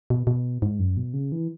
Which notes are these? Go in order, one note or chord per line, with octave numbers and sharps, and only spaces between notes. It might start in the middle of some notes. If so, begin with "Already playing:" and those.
B2
B2
G#2
F#2
B2
C#3
E3